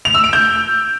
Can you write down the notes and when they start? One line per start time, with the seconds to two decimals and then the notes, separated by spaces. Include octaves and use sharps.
0.05 F7
0.14 E6
0.24 D7
0.33 G6